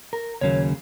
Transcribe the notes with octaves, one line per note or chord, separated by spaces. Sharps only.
A#4
D#2 C#3 F#3 A#3 C#5